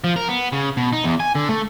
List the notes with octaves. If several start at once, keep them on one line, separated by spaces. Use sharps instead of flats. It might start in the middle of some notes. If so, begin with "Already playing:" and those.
F3
A#4
B3
C#3
B2
D#4
E2
G#5
D3
A3